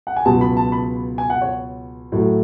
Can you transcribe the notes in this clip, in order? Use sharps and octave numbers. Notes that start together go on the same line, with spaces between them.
F#5
G#5
C#2 B2 F#3 A5
B5
A5
B5
G#5
F#5
C#5
A2 F#3 A3